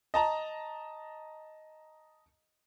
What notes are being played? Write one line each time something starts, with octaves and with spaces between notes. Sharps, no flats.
D#5 A5 A#5